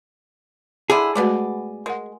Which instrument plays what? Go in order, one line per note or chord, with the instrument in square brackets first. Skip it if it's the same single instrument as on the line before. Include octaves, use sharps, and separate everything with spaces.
[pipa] D3 G#3 E4 [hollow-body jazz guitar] G#4 [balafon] C6
[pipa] B2 B3 D5 [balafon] G#3 A3 F#4
[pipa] G#3 [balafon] A#4 F#5